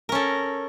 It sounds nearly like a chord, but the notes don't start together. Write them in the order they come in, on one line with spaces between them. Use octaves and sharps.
A#4 C#4 A4